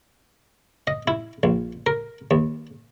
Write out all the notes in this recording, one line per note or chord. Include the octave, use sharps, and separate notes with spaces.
D#5
E4
A#1
A#4
D#2